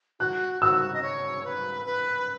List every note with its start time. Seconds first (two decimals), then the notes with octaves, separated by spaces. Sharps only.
0.20 F#4 F#6
0.61 F#4 E6
0.93 D#5
1.02 C#5
1.44 B4
1.86 B4